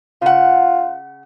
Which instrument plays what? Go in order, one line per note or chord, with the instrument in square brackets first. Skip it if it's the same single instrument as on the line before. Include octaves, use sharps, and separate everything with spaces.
[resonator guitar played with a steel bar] C#3 F#5 [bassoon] F4